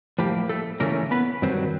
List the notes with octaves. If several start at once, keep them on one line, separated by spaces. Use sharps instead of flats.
A2 F3 G3 A#3 G4
A3 A4
C#3 E3 A3 A#3 C#4 A#4
B3 B4
G2 D#3 F#3 C4 C5